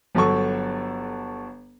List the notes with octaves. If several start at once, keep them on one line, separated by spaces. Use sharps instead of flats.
G1 F#3 A4 C#6